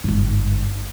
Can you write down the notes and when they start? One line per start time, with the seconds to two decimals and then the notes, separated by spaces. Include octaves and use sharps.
0.04 G1 G#2